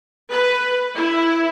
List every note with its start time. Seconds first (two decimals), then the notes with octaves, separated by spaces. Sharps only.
0.30 B4
0.96 E4